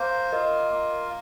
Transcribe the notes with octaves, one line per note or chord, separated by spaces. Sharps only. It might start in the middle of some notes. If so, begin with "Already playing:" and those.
Already playing: A#3 C5
F4 A#4 D#5
A#3